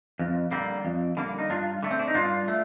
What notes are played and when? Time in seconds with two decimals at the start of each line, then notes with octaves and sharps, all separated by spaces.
0.19 F2
0.51 D3 G3 A#3
0.85 F2
1.17 D3 G3 A#3
1.38 D#4
1.50 G2 D4 F4
1.83 D3 A3
1.91 C4
1.99 D4
2.08 D#4
2.14 G2 D4 F4
2.48 A3